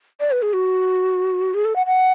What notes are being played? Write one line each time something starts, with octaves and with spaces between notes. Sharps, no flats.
D5
B4
G#4
F#4
G#4
A4
F#5
F#5